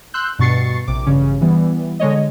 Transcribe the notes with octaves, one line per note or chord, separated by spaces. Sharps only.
C6 E6 F#6 G6
G2 B2 C#6 A6 C7 C#7
A#1 C3 D6
A1 G2 C#3 C#4
E3 G3 B3
D3 G#3 C#5 D#5